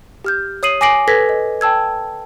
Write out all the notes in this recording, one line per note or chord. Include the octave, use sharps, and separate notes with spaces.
G4 F6 G6
C#5 D#6 C7 D#7 F#7
G#5 D6 A#6 C7 D7 F#7
A4 B4 G#6 A#6 B6
D#5
G5 A5 E6 G#6